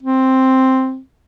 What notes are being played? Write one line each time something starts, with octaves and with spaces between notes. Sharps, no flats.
C4